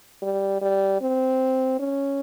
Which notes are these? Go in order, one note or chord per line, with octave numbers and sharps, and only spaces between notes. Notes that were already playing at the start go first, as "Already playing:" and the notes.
G3
G3
C4
C#4